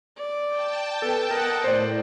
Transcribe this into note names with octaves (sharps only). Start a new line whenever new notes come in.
D5
G5 A5
B3 A4 B4
A#4 D#5 F#5
A2 C5 D5